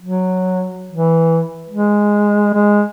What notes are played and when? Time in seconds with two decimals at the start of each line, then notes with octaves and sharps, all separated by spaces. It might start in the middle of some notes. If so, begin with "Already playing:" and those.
0.02 F#3
0.91 E3
1.70 G#3
2.53 G#3